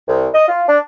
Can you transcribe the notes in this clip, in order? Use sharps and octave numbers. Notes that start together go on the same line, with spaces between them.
C2
D#5
F4
D4